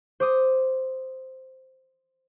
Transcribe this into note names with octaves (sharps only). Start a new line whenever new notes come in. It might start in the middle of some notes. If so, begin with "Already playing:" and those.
C5 D6 D#6